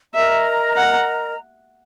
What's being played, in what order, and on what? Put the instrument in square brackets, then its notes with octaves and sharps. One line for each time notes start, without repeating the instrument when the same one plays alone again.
[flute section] A#4 D#5 A#5 [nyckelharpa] E5
[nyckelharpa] F#5